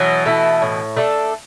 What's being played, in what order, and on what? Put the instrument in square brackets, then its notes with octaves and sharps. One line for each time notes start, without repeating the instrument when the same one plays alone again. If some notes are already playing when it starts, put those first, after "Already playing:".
Already playing: [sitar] B2 E3 [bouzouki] F#3
[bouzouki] A3 E4 A4
A2
A3 D4 A4